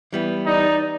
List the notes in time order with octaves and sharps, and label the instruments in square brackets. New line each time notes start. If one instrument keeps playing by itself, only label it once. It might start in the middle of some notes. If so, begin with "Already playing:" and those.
[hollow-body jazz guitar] E3 G3 B3
[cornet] D#4 [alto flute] D5